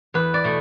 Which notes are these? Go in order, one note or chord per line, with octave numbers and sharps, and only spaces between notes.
E2 B4
D5
B2 A3